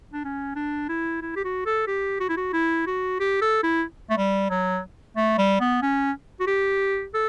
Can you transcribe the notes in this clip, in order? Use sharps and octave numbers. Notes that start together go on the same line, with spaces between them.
D4
C#4
D4
E4
E4
G4
F#4
A4
G4
F#4
E4
F#4
E4
F#4
G4
A4
E4
A3
G3
F#3
A3
G3
B3
C#4
F#4
G4
A4